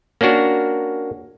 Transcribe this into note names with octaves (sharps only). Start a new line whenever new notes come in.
A#3 C#4 D4 F#4 A#4